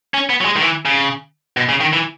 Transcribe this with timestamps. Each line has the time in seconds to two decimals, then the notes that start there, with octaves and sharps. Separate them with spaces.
0.14 C#4
0.30 B3
0.41 F#3
0.45 G#3
0.56 D#3
0.62 E3
0.85 C#3
1.57 B2
1.69 C#3
1.80 D#3
1.93 E3